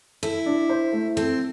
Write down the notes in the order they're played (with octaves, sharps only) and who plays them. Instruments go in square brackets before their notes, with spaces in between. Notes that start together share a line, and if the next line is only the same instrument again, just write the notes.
[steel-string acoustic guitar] E4 [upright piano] A4
[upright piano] D4
C5
A3
[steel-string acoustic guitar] C4 [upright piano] A4